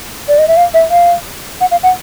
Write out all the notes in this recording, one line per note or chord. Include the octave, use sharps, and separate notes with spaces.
D5
D#5
E5
F5
E5
F5
F#5
F5
F#5